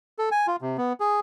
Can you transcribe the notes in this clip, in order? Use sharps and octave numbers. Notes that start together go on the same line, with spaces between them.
A4
G#5
F4
C3
B3
G#4